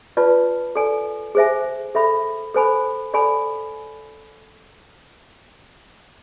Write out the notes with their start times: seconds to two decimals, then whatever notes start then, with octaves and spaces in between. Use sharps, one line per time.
0.17 F4 B4 D5 A5
0.76 A4 D5 G#5
1.35 G#4 C5 E5 G#5
1.95 A4 E5 B5
2.54 A4 C5 G#5 B5
3.14 A4 D5 G#5 B5